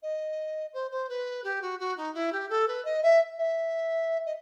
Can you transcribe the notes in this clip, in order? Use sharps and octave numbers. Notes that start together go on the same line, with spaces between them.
D#5
C5
C5
B4
G4
F#4
F#4
D#4
E4
G4
A4
B4
D#5
E5
E5
D#5